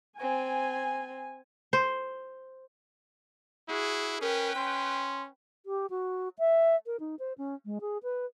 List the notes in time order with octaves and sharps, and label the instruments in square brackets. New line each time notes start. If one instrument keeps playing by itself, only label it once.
[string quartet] C4 [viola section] G#5
[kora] C5
[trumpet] E4 [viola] F#4 G#4
[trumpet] C#4 [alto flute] A#4 [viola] B4 G5
[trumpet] C#4 [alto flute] C6
[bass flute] G4
F#4
E5
A#4
D#4
C5
C#4
G#3
G#4
B4